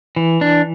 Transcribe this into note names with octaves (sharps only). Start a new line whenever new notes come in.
E3
D4